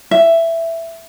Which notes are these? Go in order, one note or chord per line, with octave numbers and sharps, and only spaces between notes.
E5